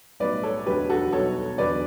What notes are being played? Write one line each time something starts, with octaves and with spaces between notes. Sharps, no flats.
B1 A2 G3 B4 D5
A4 C#5
E1 D2 D3 F#3 G4 B4
F#4 A4
B1 B2 G3 A4 C#5
E2 D3 F#3 B4 D5